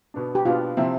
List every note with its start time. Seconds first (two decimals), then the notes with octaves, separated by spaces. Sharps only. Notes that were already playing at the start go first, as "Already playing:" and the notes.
0.14 B2 B3 D4
0.35 G4
0.45 B2 B3 D4 F4
0.77 C3 F3 C4 E4